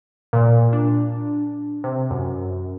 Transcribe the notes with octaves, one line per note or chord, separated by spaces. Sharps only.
A#2
D4
C3
F#2